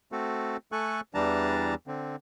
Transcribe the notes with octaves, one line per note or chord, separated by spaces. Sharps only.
A3 C4 F#4 A4
A3 A4 G#5 C#6 F#6
E2 E3 G3 D4 A5 A#5
D3 C4